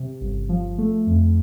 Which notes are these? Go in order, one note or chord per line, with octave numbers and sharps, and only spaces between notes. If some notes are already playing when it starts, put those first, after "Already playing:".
Already playing: C3
G1
F3
A3
F2